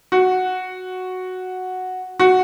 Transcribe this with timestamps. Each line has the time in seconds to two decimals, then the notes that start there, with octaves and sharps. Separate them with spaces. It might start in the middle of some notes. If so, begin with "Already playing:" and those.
0.12 F#4
2.20 F#4